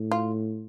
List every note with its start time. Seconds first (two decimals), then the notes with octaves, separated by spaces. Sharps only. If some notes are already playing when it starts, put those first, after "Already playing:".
Already playing: A2
0.12 F4